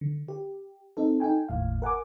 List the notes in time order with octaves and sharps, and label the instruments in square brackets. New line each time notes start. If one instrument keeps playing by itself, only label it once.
[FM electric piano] D3
G4
C4 D#4 A4
D#4 A4 G5 G#5
G1 D#2 A2 F5
A#4 F#5 G#5 D6